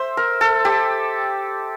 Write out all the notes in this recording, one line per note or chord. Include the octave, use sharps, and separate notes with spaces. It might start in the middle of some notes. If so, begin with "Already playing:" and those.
Already playing: C5 E5
A#4
A4
G4